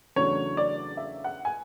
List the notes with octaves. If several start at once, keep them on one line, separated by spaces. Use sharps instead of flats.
E2 C#3 F#3 A3 D4 C#5
D5
E5
F#5
G#5